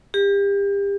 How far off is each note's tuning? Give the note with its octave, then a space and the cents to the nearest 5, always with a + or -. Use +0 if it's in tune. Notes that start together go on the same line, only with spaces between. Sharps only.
G4 +35